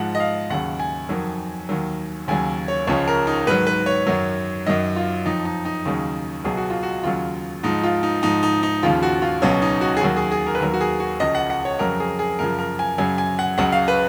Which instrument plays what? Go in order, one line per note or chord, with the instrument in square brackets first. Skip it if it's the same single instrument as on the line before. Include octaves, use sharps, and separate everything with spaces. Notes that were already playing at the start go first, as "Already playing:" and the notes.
Already playing: [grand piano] G#2 F3 F#5
D#5
F5
D#2 C#3 F#3 F#5
G#5
F2 D#3 F#3
D#2 D#3 F#3
D#2 C#3 F#3 G#5
C#5
C#2 C#3 F3 C#5
A#4
D#4
G#2 D#3 F#3 B4
B4
C#5
F#2 D#3 F#3
F#2 D#3 F#3 D#5
F4
F2 F3 D#4
D#4
D#4
D#2 C#3 F#3
C#2 B2 F#3 G#4
F#4
F4
F#4
D#2 C#3 F#3 F4
G#2 F3 D#4
F4
D#4
G#2 F3 D#4
D#4
D#4
D#2 C#3 F3 F4
F#4
F4
C#2 B2 F#3 C#4
D#4
F#4
G#4
D#2 D#3 F#3 F#4
G#4
G#4
A#4
B4
D#2 D#3 F#3 A#4
F#4
G#4
F#4
C#2 C#3 F3 D#5
F#5
F#5
C#5
F2 C#3 F#3 A#4
G#4
G#4
F#2 C#3 F3 A#4
A#4
G#5
F#2 C#3 F#3 G#5
G#5
F#5
C#2 C#3 F#3 F#5
F5
B4